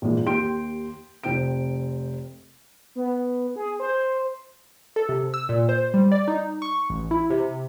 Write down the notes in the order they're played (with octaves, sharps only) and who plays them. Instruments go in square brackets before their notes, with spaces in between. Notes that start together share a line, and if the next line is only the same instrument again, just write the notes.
[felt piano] A#1 A#2 E3 G#3
D#2 G4 G5 C6 D7
F1 C5 G5 D7
[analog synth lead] B3
G#4
C5
[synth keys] A4
C3
E6
A#2
C5
G3
D5
D#4
C#6
A1
E4
C3